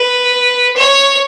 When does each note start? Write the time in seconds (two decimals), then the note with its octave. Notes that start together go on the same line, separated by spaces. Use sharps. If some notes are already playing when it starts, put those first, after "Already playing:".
Already playing: B4
0.76 C#5